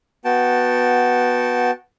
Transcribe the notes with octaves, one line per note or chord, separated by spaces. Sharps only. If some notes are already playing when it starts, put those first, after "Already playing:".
B3 F#4 G5 A5